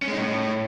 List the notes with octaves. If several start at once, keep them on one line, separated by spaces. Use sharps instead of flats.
C#4
G#3
D#4
A2